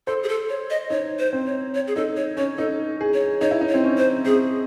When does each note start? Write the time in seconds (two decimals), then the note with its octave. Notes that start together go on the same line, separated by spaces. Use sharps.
0.07 A4 C5
0.23 G#4
0.28 A4
0.49 C#5
0.70 D#5
0.90 D#4 C#5
1.19 C5
1.33 C4
1.46 C#5
1.75 C#5
1.87 G#4
1.96 D#4 A4
2.17 C#5
2.37 C#4 C#5
2.58 D#4 A4
3.01 G#4
3.14 C#5
3.41 D#4 C#5
3.51 E4
3.61 D#4
3.69 C#5
3.74 C4
3.84 C#4
3.98 C5
4.25 C4 G#4